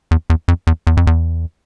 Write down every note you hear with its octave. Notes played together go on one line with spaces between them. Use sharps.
E2
E2
F2
E2
E2
F2
E2